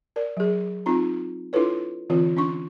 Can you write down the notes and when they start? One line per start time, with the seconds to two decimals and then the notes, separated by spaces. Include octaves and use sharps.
0.16 A#4 D5
0.37 F#3 G#4
0.86 C4 D#4 F4 A#5
1.53 D4 E4 F4 A4 B4 C#5
2.10 D3 E3 C4 F4 C#5
2.37 C#4 D4 C#6